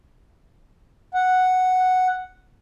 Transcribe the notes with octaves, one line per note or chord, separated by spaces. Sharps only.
F#5